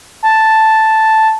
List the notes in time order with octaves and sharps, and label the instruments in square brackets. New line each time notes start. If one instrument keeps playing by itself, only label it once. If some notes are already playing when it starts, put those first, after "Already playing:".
[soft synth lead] A5